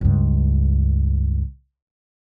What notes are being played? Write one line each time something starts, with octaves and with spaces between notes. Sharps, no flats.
C#2 G2